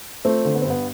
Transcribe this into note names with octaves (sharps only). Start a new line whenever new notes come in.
F3 A3 C4
D3
B3
G2 C4
B3